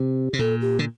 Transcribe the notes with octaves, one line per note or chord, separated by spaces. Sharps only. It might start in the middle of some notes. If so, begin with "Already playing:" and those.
Already playing: C3
C3
A#2 A4
G4
D3